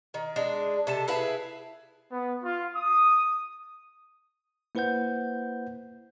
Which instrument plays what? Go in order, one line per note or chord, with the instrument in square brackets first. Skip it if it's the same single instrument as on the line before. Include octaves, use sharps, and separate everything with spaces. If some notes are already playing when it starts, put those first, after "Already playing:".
[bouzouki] D#3
G#3 D4
C3 A4 A5
E4 G#4 B4 F5
[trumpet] B3
F4
D#6
[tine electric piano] A#3 E4 B4 C5 F#5 G6